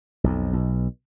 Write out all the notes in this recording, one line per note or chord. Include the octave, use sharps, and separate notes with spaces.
B1 F2
B1 B2